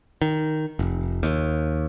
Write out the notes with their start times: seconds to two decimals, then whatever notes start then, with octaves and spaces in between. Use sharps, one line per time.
0.22 D#3
0.79 F1
1.23 D#2